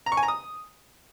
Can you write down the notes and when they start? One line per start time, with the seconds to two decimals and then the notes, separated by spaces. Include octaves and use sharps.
0.06 A#5
0.12 C#6
0.17 G#5
0.23 A#5
0.28 D#6